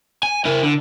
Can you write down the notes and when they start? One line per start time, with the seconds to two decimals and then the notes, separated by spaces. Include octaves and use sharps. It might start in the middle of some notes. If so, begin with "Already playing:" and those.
0.23 G#5
0.45 E4 A#4
0.63 D3